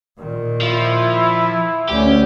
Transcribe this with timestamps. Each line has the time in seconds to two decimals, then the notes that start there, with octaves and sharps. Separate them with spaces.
0.18 A#2 D#3
0.61 F3 E4
1.89 D2 C#4 G4